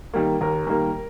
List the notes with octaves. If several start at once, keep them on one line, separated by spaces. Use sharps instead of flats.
D#3 G3 A#3
D#2 A#4
D#3 G3 A#3